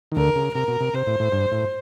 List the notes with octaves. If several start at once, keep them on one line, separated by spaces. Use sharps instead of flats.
D#3
D2 D3 A#4
C#3
C3 A#4
B2
C3
C3 C5
A2
A2
G2
A2